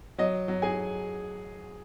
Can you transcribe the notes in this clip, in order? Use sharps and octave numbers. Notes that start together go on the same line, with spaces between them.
F#3 D#5
F#3
G#4 G#5